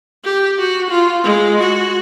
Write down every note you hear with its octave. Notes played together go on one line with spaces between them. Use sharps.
G4
F#4
F4
G#3
F#4